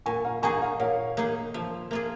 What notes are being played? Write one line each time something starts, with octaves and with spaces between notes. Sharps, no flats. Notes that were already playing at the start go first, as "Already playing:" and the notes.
A#2 G#5 C#6
F5 A#5
A#3 D#4 G#4 G#5 C#6
F5 A#5
A#2 C#5 F5
A#3 D#4 G#4
F3
A#3 F4 G#4